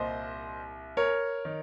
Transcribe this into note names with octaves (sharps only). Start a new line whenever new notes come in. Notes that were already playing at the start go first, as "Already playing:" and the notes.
Already playing: C2 A#2 C5 D#5
A#4 C#5
D#3